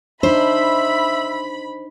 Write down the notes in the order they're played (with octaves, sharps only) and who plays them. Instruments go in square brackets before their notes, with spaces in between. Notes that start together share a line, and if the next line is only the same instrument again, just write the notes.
[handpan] D4 D#4 [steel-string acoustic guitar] C5 [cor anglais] E5 [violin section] B5